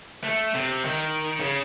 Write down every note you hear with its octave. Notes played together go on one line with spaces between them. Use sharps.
A3
C3
D#3
C#3